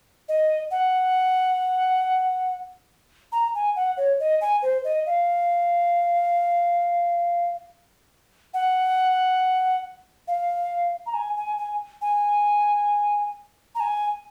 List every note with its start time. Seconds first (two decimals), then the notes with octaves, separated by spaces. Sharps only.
0.29 D#5
0.71 F#5
3.32 A#5
3.55 G#5
3.76 F#5
3.97 C#5
4.20 D#5
4.41 G#5
4.62 C5
4.84 D#5
5.06 F5
8.54 F#5
10.28 F5
11.06 A#5
11.14 G#5
11.37 G#5
11.58 G#5
12.02 G#5
13.75 A#5
13.80 G#5